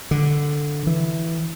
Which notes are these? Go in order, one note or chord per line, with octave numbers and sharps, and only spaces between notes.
D3
E3